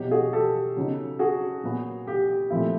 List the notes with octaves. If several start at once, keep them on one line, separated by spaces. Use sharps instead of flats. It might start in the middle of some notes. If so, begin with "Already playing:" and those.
Already playing: B2 F#3 B3 E4 G4
F#4 G#4
G4 A4
C#3 F#3 B3 D#4
F#4 G#4
A#2 F#3 B3
G4
A#2 F3 A3 C4 E4